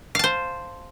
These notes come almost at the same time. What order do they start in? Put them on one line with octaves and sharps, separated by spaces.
F5 A5 C5